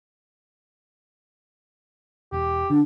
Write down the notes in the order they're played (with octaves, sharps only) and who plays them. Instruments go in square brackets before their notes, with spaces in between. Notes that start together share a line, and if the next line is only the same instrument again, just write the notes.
[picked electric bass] E1 [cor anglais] G4
[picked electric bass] D3 [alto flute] D4